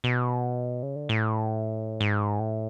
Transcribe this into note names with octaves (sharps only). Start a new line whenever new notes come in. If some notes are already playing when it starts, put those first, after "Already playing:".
B2
C#3
D3
A2
G#2
A2